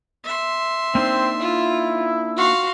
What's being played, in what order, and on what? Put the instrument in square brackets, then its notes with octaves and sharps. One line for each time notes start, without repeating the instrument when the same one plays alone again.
[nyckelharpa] E5 C6
[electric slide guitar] A#3 D4 D#4 [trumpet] C4
[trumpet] E4 [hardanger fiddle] F4
[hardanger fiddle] F#4 [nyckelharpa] F5 C6